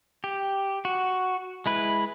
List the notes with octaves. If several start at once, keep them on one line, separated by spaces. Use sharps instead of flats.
G4
F#4
G#3 E4 B4